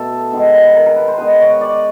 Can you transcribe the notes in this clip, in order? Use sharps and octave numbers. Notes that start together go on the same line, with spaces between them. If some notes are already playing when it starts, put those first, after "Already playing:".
Already playing: B2 A3 B3 A4
D#3 G#3 B3
B4
A#4
A#4
B4
C5
D#3 G#3 B3 B4
C#5
D5